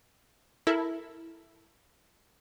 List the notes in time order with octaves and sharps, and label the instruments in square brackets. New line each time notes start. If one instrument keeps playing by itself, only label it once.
[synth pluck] E4 A4 A#4 E5